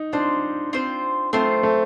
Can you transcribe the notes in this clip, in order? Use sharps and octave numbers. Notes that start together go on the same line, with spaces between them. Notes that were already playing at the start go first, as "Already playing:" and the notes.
Already playing: D#4
C4 D4 F4 C5
C4 F4 C5
A3 C4 F4 C5
A3